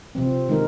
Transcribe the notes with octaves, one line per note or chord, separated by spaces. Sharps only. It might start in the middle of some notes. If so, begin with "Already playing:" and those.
C3 F3 C4
D#3 G#3 D#4 A#4